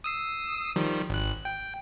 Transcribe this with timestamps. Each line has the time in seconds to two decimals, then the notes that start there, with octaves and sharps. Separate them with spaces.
0.04 D#6 E6 C7
0.76 D#3 F3 G3
1.10 G#1 F#6
1.45 G5